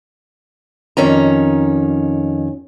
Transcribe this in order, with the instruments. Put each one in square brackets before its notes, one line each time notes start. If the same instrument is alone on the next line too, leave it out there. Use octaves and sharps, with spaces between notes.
[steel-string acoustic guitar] F2 D#3 C#4 A#5